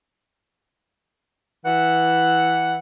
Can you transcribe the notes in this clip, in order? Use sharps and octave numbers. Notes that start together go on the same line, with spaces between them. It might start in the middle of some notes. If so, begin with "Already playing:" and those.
E3 F#5